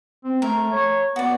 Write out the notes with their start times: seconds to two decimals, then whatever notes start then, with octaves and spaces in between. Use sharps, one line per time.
0.24 C4
0.42 A3 A#4
0.72 C#5
1.16 B3 F#4 D5